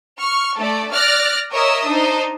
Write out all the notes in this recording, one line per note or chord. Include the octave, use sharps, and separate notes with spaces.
C#6 F6
A3 A4 D5
D5 F6 F#6 A#6
A#4 C#5 D#5 E5 D#6 E6
D4 D#4 C5